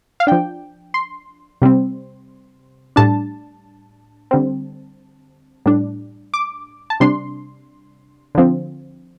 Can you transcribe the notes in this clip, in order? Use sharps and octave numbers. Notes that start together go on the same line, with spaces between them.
F5
F3 D4 G5
C6
C3 G3 C4
A2 G3 D4 A5
D3 G3 C4
A2 G3 D4
D6
A5
C3 G3 D4 C6
D3 F3 C4